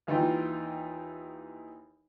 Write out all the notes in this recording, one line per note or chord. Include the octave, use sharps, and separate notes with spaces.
D#2 E3 D#4 F4 G5